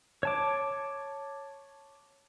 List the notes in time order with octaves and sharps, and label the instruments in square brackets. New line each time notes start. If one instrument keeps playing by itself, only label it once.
[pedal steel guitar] C#5 A5 D6